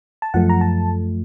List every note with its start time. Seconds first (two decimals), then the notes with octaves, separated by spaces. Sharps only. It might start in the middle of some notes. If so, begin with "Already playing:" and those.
0.22 A5
0.34 F#2 F3 A3 F#5
0.49 A#5
0.61 A5